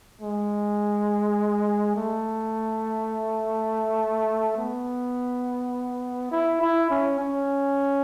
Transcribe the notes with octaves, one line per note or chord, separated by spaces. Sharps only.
G#3
A3
B3
E4
E4
C#4
C#4